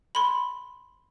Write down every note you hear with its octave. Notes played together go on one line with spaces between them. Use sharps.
B5 C6